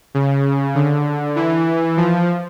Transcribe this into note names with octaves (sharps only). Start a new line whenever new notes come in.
C#3
D3
E3
F3